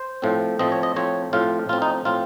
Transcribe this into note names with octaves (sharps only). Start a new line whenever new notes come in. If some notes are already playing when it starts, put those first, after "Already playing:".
Already playing: C5
A2 F3 C4
A2 F3 C4 D#5
C#5
D#5
A2 F3 C4 C#5
A2 F3 C4 F4
A2 F3 C4 F4
D#4
A2 F3 C4 F4